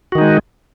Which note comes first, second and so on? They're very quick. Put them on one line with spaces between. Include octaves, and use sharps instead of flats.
F#4 D#3 D#4 G#3